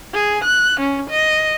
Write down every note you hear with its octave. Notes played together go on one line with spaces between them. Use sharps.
G#4
F#6
C#4
D#5